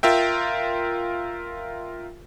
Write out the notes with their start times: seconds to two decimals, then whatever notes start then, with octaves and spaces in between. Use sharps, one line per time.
0.03 F4 A#4 E5 G5